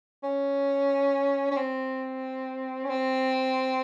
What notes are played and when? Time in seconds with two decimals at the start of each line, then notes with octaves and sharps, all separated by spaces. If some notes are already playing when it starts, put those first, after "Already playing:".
0.23 C#4
1.51 C#4
1.56 C4
2.84 C#4
2.89 C4